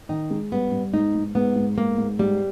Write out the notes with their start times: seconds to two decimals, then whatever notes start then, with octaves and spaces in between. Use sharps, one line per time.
0.09 D#3 D#4
0.30 G#3
0.52 G2 B3
0.72 G2
0.94 G#2 D#4
1.15 G#2
1.35 G#2 B3
1.56 G#2
1.77 G#2 A#3
1.98 G#2
2.19 G#2 G3